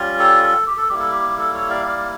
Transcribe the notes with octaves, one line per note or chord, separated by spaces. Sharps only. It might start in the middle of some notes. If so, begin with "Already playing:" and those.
Already playing: G3 C#4 F4
A4
A4
G4
A4
G3 A#3 E4 G4
A4
G4
A4
A4 C#5
D5 F5
D5 F5